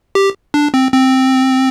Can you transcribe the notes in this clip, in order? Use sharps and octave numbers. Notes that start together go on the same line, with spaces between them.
G4
D4
C4
C4